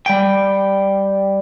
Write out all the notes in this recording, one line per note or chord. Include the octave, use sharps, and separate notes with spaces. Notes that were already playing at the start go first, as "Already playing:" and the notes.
G3 G5